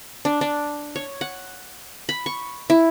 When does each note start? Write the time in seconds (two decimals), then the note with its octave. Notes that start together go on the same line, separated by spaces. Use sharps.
0.25 D4
0.41 D4
0.96 C#5
1.21 F#5
2.09 B5
2.26 C#6
2.70 E4